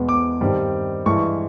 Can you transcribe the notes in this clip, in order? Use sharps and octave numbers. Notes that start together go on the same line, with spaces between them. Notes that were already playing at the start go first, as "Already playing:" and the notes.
Already playing: E2 B2 G#3 B3
D6
G2 D#3 G3 C4
G2 E3 G#3 C#6